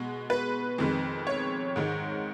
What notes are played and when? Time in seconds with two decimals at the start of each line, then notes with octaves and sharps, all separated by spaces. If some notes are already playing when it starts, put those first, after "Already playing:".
Already playing: B2 G#3
0.30 B4
0.78 F2 D#3 G#3
1.27 C#5
1.76 G#2 D#3 G#3